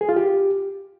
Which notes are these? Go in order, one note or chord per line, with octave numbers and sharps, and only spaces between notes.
G#4
F4
G4